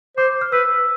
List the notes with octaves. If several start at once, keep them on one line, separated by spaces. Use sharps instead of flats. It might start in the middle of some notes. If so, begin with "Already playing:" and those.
C5 D6
F6
B4 E6